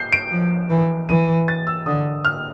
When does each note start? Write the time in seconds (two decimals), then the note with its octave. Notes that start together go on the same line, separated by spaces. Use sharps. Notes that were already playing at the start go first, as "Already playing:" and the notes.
Already playing: G6 C7
0.13 D7
0.31 F3
0.70 E3
1.09 E3 D#7
1.48 A6
1.67 E6
1.86 D3 D#6
2.25 F6